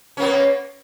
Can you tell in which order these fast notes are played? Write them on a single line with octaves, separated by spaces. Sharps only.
C#4 A#3 B3